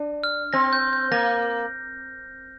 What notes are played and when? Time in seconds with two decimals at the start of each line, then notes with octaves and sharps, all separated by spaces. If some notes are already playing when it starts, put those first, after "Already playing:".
Already playing: D4
0.24 F6
0.53 C4 A#6
0.73 G6
0.93 G6
1.11 A#3 A#6